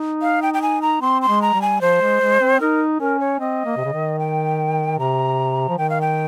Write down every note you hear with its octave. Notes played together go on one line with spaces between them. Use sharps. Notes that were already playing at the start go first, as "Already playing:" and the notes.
Already playing: D#4
F5
G5
G5
G#5
A#5
C4 C6
C6
G#3
A#5
G3
G#5
F3 C5
G#3
G#3
C4
D#4 A#4
C#4 A#4
C#5
C4 D#5
A#3
C3
C#3
D#3
G5
C3 A#5
F3
D#3 G5
F5
G5